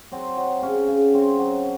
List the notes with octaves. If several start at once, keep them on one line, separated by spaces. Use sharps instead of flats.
F#3 C4
F#3
C#3 C#4
C#3
F#3 C4
F#3